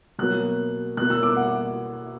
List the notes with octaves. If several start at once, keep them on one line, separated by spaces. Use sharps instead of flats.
B2 F#3 A#3 F#6
B2 A#3 F#6
E6
D6
F#5